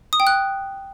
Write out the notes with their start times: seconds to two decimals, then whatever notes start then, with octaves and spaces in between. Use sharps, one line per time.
0.13 D#6
0.20 G5
0.27 F#6